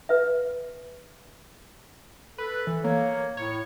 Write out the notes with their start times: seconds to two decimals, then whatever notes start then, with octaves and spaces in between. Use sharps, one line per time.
0.09 B4 E5
2.38 A4 B4
2.67 E3
2.84 A#3 C#5
3.37 A2 C#5